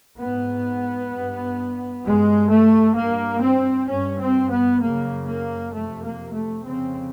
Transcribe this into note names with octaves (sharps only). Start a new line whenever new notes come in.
G#2 B3
G2
G2 G#3
A3
G2 A#3
C4
G2 C#4
C4
B3
F#2 C#3 A#3
A#3
F2 C3 A3
A#3
A3
F2 C#3 C4